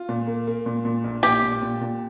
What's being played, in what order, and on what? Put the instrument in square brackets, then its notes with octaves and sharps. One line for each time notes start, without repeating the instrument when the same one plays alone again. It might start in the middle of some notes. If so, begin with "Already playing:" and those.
Already playing: [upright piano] F4
A#2
A#3
A#3
A#2
A#2
A#1
[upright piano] A#1 [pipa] G4
[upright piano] A#2
A#2
A#2